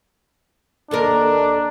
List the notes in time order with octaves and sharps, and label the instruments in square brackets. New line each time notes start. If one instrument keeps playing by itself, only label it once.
[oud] D#2 A4 A#4 [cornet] D4